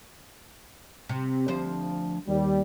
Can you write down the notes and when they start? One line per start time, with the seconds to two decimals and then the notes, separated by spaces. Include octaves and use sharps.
1.09 C3
1.48 D2 F3 C5
2.28 D#2 G3